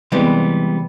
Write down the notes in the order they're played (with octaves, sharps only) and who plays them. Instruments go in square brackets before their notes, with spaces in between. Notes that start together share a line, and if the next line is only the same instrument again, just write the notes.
[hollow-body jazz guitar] C3 E3 G3 G#3 B3